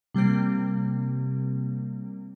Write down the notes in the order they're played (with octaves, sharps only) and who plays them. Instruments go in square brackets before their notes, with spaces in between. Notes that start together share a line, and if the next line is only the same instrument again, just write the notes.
[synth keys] C3 G3 A#3 C4